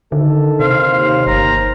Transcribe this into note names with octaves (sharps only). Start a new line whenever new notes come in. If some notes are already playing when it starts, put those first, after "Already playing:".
D3 D#3 A4
C3 C5 F5
D#2 F5
G1 A#5